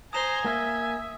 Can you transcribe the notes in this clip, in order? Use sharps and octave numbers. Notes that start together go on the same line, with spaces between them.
C5 G#5 A#5 D#6 E7
A#3 E5